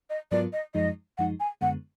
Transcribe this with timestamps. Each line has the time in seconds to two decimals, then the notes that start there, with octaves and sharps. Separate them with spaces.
0.10 D#5
0.31 G#2 F#3 B3 F4 A#4 D5
0.53 D#5
0.75 F#2 F3 G#3 D#4 D#5
1.18 F#2 F3 G#3 D#4 F#5
1.40 G#5
1.61 F#2 D3 G#3 B3 F#5